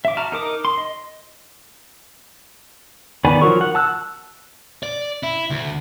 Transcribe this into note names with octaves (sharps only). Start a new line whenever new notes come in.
E5 D6
F#4 A5 A#5 F6
D#4 A#4 D6 D#6
C6
D#5
D#3 B3 D5 G#5 B5
F3 F#3 A#4 C#6
F#5
A5 E6 F#6
D5
E4
D2